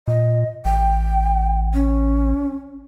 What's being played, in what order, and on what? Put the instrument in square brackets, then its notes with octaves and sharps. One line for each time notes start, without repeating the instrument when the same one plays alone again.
[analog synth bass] A#2 [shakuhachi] D#5
[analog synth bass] A1 [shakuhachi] G5
[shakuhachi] C#4